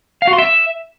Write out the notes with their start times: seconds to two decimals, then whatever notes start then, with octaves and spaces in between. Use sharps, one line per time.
0.22 F5
0.27 F#4
0.33 C6
0.38 E5